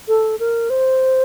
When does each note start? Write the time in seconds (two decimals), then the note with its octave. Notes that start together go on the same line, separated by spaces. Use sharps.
0.08 A4
0.39 A#4
0.70 C5